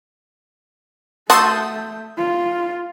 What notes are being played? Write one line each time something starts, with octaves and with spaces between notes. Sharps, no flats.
A3 F#4 A5 C6 D#6 E6 G6
F4